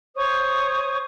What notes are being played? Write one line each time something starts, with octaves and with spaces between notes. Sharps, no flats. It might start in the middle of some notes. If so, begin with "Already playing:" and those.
C5 C#5 C#6 D#6